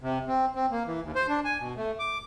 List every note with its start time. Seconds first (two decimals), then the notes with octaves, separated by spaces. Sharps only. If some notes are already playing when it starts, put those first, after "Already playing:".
0.01 C3
0.28 C4
0.55 C4
0.71 A#3
0.87 E3
1.02 D#2
1.15 C5
1.29 D4
1.45 G#5
1.60 B2
1.77 A3
1.99 D6